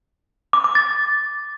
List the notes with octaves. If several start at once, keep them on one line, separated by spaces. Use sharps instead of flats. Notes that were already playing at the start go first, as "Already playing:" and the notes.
D6
D6
A6